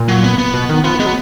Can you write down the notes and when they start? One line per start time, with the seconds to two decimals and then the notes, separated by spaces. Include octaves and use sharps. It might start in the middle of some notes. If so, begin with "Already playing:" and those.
Already playing: A#2
0.09 F#3
0.24 B3
0.38 B3
0.54 B2
0.69 D#3
0.84 F3 B3
1.00 G#3 B3
1.06 F#3